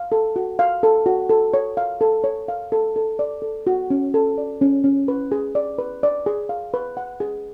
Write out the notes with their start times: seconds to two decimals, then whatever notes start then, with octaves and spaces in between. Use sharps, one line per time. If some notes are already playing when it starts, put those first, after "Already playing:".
Already playing: F5
0.12 A4
0.36 F#4
0.59 F5
0.83 A4
1.06 F#4
1.29 A4
1.54 C#5
1.77 F5
2.01 A4
2.24 C#5
2.48 F5
2.72 A4
2.96 A4
3.19 D5
3.42 A4
3.67 F#4
3.90 C#4
4.14 A4
4.38 D5
4.61 C#4
4.84 C#4
5.08 B4
5.32 G#4
5.55 D5
5.78 B4
6.03 D5
6.26 G#4
6.49 F5
6.74 B4
6.97 F#5
7.20 G#4